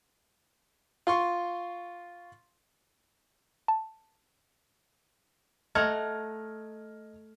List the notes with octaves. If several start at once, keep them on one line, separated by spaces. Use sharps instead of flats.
F4 C6 C#6
A5
A3 D#5 F#5 A#5 F6 G#6